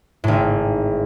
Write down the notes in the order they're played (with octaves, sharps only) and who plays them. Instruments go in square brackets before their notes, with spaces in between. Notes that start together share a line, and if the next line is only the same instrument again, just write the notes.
[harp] G#1 A2